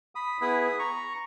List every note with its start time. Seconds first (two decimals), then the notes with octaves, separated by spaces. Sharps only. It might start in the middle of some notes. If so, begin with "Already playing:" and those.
0.15 B5 D#6
0.41 B3 E4 G#4 B5 D#6
0.79 A#5 C#6